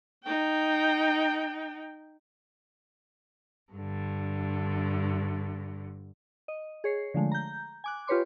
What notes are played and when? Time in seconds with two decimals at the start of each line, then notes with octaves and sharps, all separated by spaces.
0.24 D#4 G5
3.72 G2 D3
6.48 D#5
6.84 G#4 C#5 C7
7.14 D3 F3 G#3 A3
7.32 A#5 G6
7.84 G#5 D6 F#6
8.07 F4 G4 B4 C#5 C6 D6